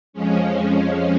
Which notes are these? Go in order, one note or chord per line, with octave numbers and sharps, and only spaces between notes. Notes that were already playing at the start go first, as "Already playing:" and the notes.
F2 F3 G#3 C#4